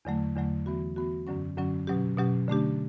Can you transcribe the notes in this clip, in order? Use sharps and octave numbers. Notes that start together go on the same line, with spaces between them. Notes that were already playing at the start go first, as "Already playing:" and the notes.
E2 D3 F#3 A3
E2 D3 F#3 A3
E3 B3 F#4
E3 B3 F#4
F#2 D3 F#3 C#4
F#2 D3 F#3 C#4
B2 F#3 C#4 G4
B2 F#3 C#4 G4
D3 A3 D4 G4